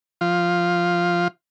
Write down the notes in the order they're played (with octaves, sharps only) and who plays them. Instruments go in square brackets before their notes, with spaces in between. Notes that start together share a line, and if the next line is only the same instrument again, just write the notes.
[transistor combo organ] F3 F4